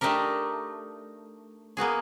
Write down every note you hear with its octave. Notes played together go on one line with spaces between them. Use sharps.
A3 D4 D#4 G4 A#4
A#3 B3 F#4 G#4